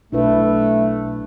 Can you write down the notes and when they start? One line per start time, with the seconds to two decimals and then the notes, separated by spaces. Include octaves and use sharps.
0.12 B1 A3 D4 E4 B4